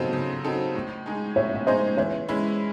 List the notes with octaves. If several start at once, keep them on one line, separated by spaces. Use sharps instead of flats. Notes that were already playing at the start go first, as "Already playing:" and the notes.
Already playing: C#3 F#3 C4 D#4 A4 C5 D#5
C#3
F#3 C4 D#4 A4
A2
G#3 D#4 G#4
A2 C#5 E5
E5
G#3 D#4 G#4 C5 D#5
E3 C#5 E5
G#3 C#4 E4